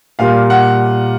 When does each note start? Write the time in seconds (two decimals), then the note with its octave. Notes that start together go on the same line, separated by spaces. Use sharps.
0.19 A#2 G3 A#3 F5
0.50 F#5